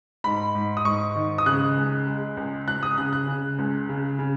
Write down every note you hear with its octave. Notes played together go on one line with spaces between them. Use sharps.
G#2 B5
G#2
D#6
G#2 C#6
D#3
D#6
C#3 F#6
C#2
G#3
C#2
C#2 F#6
D#6
C#3 F#6
F#6
C#3
C#2
C#3
C#3